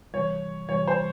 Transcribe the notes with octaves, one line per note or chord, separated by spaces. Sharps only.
C3 E3 G3 C#5
C3 E3 G3 C#5
C5